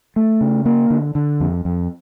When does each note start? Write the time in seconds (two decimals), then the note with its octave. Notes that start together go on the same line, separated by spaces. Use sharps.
0.16 A3
0.41 C#3
0.65 A#3
0.90 D3
1.15 D3
1.40 F2
1.65 F2